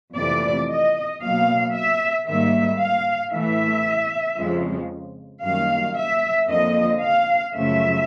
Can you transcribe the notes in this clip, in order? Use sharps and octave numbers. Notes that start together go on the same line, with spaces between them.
F2 C3 E3 A3 D5
D#5
B2 F#3 A#3 F5
E5
G#2 D#3 G3 A#3 E5
F5
A2 E3 A3 E5
F2 C#3 F3 G#3
F#2 D#3 G3 A#3 F5
E5
F2 D3 F3 A#3 D#5
F5
F#2 C#3 F3 A3 E5